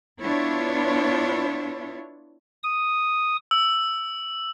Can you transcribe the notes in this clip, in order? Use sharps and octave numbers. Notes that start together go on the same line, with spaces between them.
B3 D4 E4 F4 C#5
D#6
E6